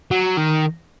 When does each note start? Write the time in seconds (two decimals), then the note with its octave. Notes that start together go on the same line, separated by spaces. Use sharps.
0.11 F#3
0.37 D#3